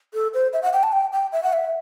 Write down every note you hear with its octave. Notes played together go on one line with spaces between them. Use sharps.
A4
C5
E5
F#5
G5
A5
G5
G5
E5
F#5
E5